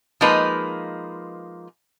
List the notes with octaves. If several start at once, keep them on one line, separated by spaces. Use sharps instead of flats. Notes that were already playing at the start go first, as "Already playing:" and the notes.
F3 G#3 A#3 D#4 B4